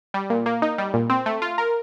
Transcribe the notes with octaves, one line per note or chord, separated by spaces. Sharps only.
G3
A#2
A#3
D#4
G3
A#2
C4
A3
F4
A#4